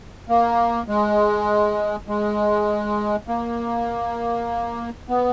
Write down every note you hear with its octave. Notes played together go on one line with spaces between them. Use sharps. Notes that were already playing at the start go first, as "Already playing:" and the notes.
A#3
G#3
G#3
A#3
B3